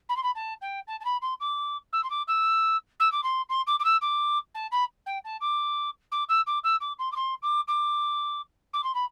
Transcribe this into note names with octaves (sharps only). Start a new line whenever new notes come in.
B5
C6
B5
A5
G5
A5
A5
B5
C6
D6
E6
C6
D6
E6
E6
D6
C6
C6
D6
D6
E6
D6
A5
B5
G5
A5
D6
D6
E6
D6
E6
D6
C6
D6
C6
D6
D6
D6
C6
B5